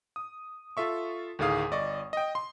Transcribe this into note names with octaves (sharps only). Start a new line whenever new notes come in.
D#6
F4 A4 E5 C#6
D2 A2 D#3 G#4 F5 D#6
G1 D5 D#5 C#6
D#5 G5
C6